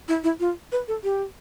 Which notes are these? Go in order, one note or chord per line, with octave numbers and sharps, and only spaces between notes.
E4
E4
F4
B4
A4
G4